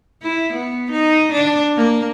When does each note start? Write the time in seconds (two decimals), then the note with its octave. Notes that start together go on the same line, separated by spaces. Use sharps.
0.23 E4
0.53 B3
0.91 D#4
1.32 D4
1.77 A#3